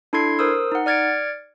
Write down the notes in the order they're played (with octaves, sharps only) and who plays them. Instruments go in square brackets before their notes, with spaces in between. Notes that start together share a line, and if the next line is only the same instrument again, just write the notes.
[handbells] D4 E4 A4 C6 G#6 C7
A#4 C5 D#6 E6
D#4 F#5
D5 F6 G#6 A6 C#7 D7